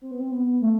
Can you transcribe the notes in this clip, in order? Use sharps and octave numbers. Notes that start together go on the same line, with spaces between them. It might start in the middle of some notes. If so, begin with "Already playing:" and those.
C4
B3
C4
B3
A3